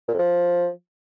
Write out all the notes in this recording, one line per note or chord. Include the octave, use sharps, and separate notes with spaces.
A#2
F2
F3